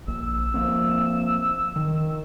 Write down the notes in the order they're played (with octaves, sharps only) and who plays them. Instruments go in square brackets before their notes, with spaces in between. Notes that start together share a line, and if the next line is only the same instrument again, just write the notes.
[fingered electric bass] A#1 [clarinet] E6
[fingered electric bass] F3 A#3 C4
D#3